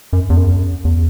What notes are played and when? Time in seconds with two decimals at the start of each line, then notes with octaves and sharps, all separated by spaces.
0.13 F#2
0.30 E2
0.37 F#2
0.85 E2